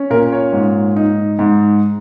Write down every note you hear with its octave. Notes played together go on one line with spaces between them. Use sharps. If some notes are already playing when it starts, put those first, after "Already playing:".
Already playing: C#4
A#2 A#4
C#5
G#2
D#4
G#2